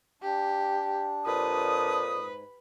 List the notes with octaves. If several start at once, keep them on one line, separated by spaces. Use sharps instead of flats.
D4 G4
F2 A#2 B4 D#6
G#2